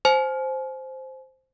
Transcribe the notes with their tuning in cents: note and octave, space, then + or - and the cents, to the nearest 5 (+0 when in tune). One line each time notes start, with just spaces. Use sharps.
C5 +0 G#5 +40